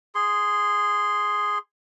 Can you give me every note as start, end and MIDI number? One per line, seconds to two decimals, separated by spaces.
0.15 1.58 68
0.15 1.58 84